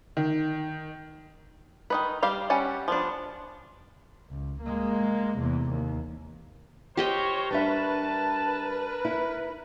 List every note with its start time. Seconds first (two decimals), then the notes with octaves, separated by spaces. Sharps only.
0.17 D#3
1.90 D#3 D#4 B4
2.23 G3 G4 F5
2.50 G3 C#4 F#5 A5
2.88 F3 B3 D4
4.30 C#2
4.62 G#3 A#3
5.38 E2 C3
5.71 D#2
6.97 G4 A#4 C5 C#5 D#5 G5
7.51 G3 D4 A#4 B4 E5 A5
9.05 E4